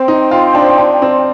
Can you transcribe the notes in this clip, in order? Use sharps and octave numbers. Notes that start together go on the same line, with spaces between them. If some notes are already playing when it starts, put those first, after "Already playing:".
Already playing: C4 C5 G5 C6
D#4
F4
D4
D4
C4